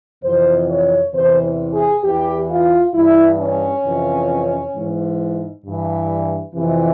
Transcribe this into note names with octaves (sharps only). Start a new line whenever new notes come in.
F2 C3 E3 C5
C#5
E2 C3 E3 C5
G#4
E2 E3 G4
F4
G2 E3 E4
C#4
F2 C3 E3
G#2 E3
G2 E3
F2 C3 E3